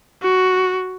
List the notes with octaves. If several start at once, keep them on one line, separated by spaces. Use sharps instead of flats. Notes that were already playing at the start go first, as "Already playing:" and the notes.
F#4